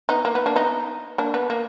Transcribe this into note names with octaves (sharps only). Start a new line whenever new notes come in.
B3 D#4
A#3
B3
A#3 D4
B3 D#4
A#3 D4
B3
A#3